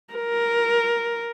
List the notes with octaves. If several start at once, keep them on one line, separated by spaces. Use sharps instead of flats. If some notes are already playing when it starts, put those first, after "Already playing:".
A#4